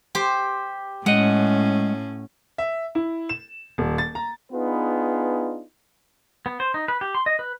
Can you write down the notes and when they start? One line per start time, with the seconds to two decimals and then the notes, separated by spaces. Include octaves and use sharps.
0.15 G4 C5
1.06 A2 G#3 C#4 D#5 F#5
2.58 E5
2.95 E4
3.29 E7
3.78 D#1
3.98 A6
4.15 A#5
4.52 B3 D4 D#4 F4 G#4 B4
6.46 B3
6.60 C5
6.74 D#4
6.88 B4
7.01 G4
7.15 C6
7.26 D#5
7.39 B4